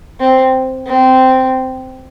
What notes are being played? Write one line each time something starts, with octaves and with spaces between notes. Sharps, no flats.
C4
C4